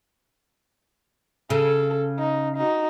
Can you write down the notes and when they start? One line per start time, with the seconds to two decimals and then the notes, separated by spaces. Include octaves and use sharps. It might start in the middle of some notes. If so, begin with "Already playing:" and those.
1.50 C#3 A4
2.19 D#4
2.57 D#4 F#4